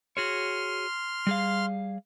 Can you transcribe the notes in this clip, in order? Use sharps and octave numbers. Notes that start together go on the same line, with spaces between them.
F#4 G#4 C#5 C6 F6
G3 G#4 F5